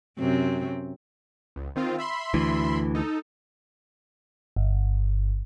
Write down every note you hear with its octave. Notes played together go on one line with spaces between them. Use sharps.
F#2 C3 C4
C#2
D#3 C4 F4
E5 B5 C6
D2 E3
D#4 A4
G1